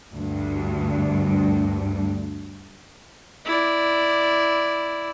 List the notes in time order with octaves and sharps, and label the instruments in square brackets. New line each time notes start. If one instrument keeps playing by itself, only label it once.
[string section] D2 G2
[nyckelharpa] E4 D5